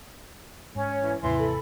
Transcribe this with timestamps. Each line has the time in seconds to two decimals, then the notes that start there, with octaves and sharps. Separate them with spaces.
0.75 G#2 C#4 C#5
1.02 E3
1.23 D#2 G#2 C3 E3 C6
1.38 A4 B5